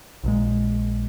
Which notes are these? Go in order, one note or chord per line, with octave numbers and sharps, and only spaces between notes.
A#1 A#2 G#3